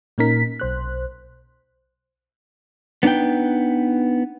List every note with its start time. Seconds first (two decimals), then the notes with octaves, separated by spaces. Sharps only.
0.18 A#2 A#3 C#4 D#4 A#4 B6
0.60 B1 C5 F#6
3.03 B3 D4 D#4 B4 G5